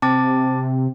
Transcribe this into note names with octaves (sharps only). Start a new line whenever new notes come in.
C3 C4 A5 D6 A6